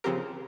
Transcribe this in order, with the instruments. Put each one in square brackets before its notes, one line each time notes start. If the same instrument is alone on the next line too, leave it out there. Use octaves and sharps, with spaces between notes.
[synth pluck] C#3 F3 C4 G4 A#4